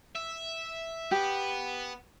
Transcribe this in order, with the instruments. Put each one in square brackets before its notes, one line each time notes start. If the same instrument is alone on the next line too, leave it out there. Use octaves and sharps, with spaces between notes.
[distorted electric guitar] E5
[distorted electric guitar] B3 [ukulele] G4